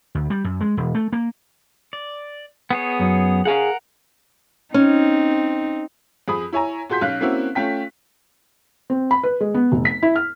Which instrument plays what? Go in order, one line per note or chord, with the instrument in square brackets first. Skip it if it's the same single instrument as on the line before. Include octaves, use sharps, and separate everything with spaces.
[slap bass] D2
G3
F#2
G#3
E1
A3
A#3
[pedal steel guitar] D5
B3 G#4 C#5
[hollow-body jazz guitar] F#2
[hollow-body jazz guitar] G#4 F5 G#5 [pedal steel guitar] A#4 F#5
[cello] C4 D#4 [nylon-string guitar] C#4
[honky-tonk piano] F2 G#4 B5 D#6
E4 C#5 G#5 A#5
A#2 F#4 G#4 C6 G6 B6
B1 C#4 F5 F#6
A#3 C4 C#4 E4 F#4
A3 C#4 F4 G5 B6
[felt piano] C4
B5
B4
G#3
B3
F1
B6
E4
F6